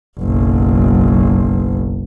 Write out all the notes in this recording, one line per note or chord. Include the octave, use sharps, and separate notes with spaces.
F#1 B1